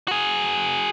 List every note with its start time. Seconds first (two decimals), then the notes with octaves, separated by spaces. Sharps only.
0.08 F#4 G#4